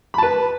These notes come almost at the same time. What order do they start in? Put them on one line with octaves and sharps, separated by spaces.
B5 A5 B4